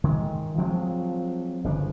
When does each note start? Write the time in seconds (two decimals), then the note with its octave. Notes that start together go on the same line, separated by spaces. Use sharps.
0.04 D#3 G#3
0.58 F3 F#3 G#3 C4
1.64 G1 C#3 F3 D4